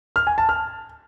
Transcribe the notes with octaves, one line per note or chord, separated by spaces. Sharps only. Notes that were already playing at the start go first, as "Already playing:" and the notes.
F6
G#5
A5
F6